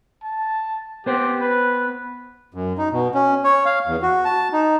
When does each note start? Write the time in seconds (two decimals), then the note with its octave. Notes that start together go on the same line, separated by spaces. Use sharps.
0.23 A5
1.06 B3 G4 C5 G5
1.41 B4
2.54 F#2
2.78 D#4
2.92 B2
3.14 C#4
3.44 C#5
3.65 F5
3.87 E2
4.02 F#4
4.25 A5
4.53 D#4